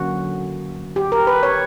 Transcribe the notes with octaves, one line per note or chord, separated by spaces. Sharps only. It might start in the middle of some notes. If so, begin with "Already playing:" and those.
Already playing: D3 F#3 A#3 C#4 F#4
G4
A#4
B4
C#5